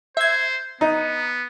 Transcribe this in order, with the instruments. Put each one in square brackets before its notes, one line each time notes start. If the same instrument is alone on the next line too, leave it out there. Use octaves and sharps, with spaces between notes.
[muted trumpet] C5 [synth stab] E5 G#6
[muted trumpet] B3 [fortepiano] D#4